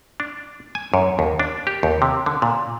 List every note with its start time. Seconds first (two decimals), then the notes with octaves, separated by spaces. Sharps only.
0.20 D4
0.75 G#5
0.94 F#2
1.19 D#2
1.39 D4
1.67 G4
1.83 D#2
2.02 C3
2.26 D3
2.42 A#2